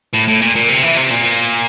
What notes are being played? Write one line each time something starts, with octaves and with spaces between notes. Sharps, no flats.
A2
A2
A#2
A#2
C3
E3
C3
A#2